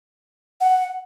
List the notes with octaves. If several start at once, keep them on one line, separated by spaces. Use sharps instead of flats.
F#5